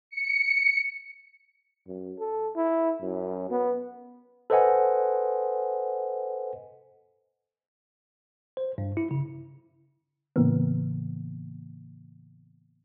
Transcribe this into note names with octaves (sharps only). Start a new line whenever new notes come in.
C#7
F#2
A4
E4
F#2
B3
A4 B4 C5 D#5 F#5 G#5
C5
G2
E4
C#3
A2 C#3 E3 A#3 B3